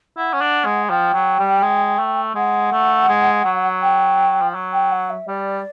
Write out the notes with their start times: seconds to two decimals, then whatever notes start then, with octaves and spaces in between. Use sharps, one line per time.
0.17 E4 F#5
0.33 C#4
0.41 D4
0.65 G#3
0.90 F3 G5
1.14 F#3
1.39 G3
1.63 G#3
1.99 A3
2.35 G#3 F#5
2.72 A3
3.09 G#3
3.45 F#3
3.82 G5
4.42 F3
4.54 F#3
4.73 G5
4.91 F#5
5.09 E5
5.28 G3 D5